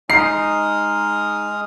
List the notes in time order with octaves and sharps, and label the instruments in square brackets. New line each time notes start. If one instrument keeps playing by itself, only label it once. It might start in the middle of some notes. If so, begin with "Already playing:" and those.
[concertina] G#3 D#6 F6 [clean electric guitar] D#4 [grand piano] C7